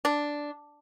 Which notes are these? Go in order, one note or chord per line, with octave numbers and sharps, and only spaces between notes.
D4